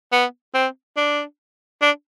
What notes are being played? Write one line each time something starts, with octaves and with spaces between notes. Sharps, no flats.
B3
C4
D4
D4